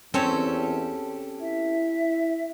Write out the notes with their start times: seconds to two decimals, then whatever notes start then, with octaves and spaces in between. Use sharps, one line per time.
0.14 E2 C4 C#4 G4 A4 C#5
1.41 E4 E5